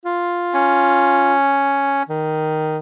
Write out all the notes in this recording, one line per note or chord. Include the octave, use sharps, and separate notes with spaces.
F4
C#4
D#3